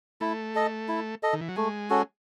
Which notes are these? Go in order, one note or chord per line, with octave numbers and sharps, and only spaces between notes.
A3 E4
A4 D#5
E4
A4 D#5
D#3
E3
F#3
G#3 A3
C#4 F#4 A4